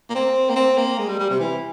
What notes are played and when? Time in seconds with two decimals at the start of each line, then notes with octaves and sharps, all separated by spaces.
0.10 A#3
0.15 C4
0.50 A#3
0.56 C4
0.78 A#3
0.98 G#3
1.09 G3
1.20 G3
1.30 C3
1.40 E3